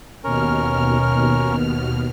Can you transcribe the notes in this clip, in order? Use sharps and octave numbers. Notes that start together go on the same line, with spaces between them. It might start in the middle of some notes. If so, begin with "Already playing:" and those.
D#2 B2 C#4 A#4 F6